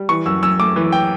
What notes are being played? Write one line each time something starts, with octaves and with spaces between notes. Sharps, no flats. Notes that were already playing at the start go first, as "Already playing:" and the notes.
Already playing: G3
E3 C#6
F#2 E6
F#2 E6
A3 D6
E3
G5